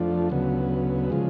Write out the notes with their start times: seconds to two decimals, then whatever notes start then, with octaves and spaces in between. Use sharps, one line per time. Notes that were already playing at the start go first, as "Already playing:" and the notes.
Already playing: F2 F3 A3 D4
0.30 D2 C#3 F#3 B3
1.10 C#3 F3 G#3